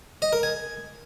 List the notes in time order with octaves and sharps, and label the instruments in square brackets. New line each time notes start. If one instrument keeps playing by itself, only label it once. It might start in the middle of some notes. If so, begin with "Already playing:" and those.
[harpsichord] D#5
A#4
G#5